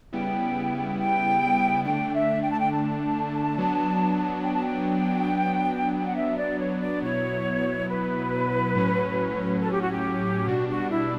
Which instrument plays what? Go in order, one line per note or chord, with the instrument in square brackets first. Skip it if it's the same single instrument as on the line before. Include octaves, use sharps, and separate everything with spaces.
[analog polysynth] C#3 G3 B3 E4 [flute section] G5
[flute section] G5
[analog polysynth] D3 A3 D4 [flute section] G5
[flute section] E5
G5
A5
G5
A5
[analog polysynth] F#3 B3 D4
[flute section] G5
A5
G5
[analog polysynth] F#3 B3 D4
[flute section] F#5
E5
D5
C#5
D5
[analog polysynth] B2 F#3 B3 E4 [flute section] C#5
[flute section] B4
[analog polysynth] A2 F#3 C#4
[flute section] A4
G4
F#4
G4
[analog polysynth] B2 G3 D4 [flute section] F#4
[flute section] F#4
E4